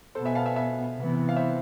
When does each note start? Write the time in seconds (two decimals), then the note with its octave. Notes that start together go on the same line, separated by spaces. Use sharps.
0.15 B2 B3 A4 C5
0.26 E5 G#5
0.35 F5 A5
0.46 E5 G#5
0.56 E5 G#5
0.96 C3 E3 B3
1.29 F5
1.36 C5 E5